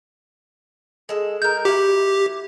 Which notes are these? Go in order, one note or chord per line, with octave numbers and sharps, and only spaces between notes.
G#3 A4
G#3 A#4 G6
E4 F#4 G4